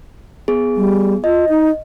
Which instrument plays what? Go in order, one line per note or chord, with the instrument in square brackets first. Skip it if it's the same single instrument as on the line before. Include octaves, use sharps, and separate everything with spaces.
[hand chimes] B3 G#4
[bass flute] G3
[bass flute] F4 [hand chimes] D#5
[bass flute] D#4